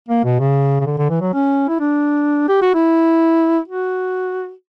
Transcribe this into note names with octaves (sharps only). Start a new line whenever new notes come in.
A#3
B2
C#3
C#3
D3
D3
E3
F#3
C#4
E4
D4
G4
F#4
E4
F#4